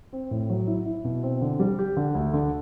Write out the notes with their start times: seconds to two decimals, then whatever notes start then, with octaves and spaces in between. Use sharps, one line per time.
0.13 C4
0.31 A2
0.50 F#3
0.67 E4
0.86 E4
1.04 B2
1.23 C4
1.41 D3
1.60 G3
1.79 G4
1.97 D3
2.15 D2
2.33 D3